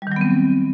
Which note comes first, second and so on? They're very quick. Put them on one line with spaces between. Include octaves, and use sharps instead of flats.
G3 D#3 F#3 B3 C4